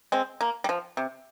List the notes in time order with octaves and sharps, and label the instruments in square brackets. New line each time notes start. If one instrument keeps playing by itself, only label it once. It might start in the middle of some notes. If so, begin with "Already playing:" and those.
[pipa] G#3 C4
A#3
G3
F3
C3